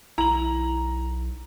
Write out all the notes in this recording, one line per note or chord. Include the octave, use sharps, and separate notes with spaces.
B1 E4 A#5 F#7